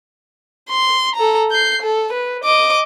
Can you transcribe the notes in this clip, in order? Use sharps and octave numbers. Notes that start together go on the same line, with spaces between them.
C6
A4 A#5
G6 C7
A4
B4
D#5 D6